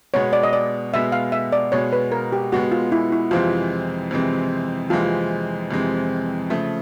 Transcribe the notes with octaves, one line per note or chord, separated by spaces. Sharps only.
B2 G#3 B3 C#5
D5
D#5
D5
B2 G#3 B3 E5
F5
E5
D5
B2 G#3 B3 C#5
B4
A#4
G4
B2 G#3 B3 F#4
F4
E4
E4
F2 C3 E3 G#3 C4 F4
F2 C3 E3 G#3 C4
F2 C3 E3 G#3 C4 F4
F2 C3 E3 G#3 C4
C#3 F3 A3